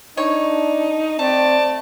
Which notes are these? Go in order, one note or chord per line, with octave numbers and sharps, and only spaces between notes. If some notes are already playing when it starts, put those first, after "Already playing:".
D4 D#4 C#5
A3 C4 D5 A5